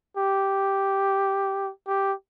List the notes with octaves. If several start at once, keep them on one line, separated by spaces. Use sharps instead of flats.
G4
G4